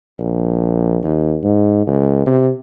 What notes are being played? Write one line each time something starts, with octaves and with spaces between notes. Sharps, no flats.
A#1
D#2
G#2
C#2
C3